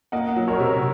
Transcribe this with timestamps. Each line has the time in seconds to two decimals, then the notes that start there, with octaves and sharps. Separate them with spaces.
0.12 A#3 D#5 F#5
0.36 F#3
0.48 A#4 C#5
0.60 C3